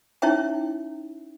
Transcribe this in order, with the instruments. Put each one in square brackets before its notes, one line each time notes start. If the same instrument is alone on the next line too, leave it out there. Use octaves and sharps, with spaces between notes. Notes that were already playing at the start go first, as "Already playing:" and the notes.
[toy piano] C#4 D#4 E4 C#5 E5 G5